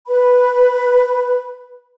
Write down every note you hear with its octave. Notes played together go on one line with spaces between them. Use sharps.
B4 B5